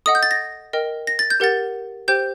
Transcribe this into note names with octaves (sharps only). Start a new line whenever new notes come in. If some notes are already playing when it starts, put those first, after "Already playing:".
A4 D#5 F#5 D#6
G6
A6
A#6
A#4 D#5 G5
A#6
A6
G6
G4 A#4 F#5 A6
G4 C5 G5 G6